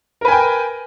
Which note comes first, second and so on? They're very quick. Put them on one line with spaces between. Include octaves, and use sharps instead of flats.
A#4 B4 G#5 G5